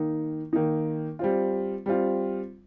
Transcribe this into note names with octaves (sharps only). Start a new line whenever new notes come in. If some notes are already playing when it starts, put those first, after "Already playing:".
Already playing: D#3 A#3 D#4
D#3 A#3 D#4
G3 C4 F4
G3 C4 F4